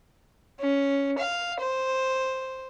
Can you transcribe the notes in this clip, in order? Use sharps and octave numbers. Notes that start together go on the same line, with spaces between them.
C#4
F5
C5